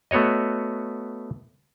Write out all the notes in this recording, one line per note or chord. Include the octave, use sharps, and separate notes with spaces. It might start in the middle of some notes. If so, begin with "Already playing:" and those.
A3 B3 F#4 C#5 D#5